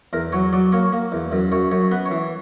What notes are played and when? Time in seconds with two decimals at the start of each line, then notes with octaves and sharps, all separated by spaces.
0.13 E2 A#4
0.33 F#3 C#5
0.53 F#3 D5
0.72 A#3 C#5
0.93 A#3
1.12 E2
1.32 F#2
1.52 F#2 C#5
1.72 F#2 C#5
1.91 B3 B4
2.06 C#5
2.11 E3